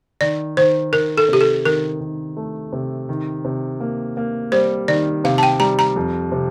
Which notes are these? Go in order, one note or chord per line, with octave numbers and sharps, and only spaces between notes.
D#3 D5
D#3 C5
D#3 A#4
A4
C3 G4
A4
D#3 A#4
D#3
A3
C3
D#3
C3
A#3
A#3
G3 C5
D#3 D5
C3 F5
A5
G5
G3 A#5
A#5
F2
C3